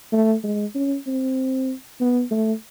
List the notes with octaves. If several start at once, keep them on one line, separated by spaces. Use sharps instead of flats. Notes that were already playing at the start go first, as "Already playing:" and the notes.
A3
G#3
C#4
C4
B3
A3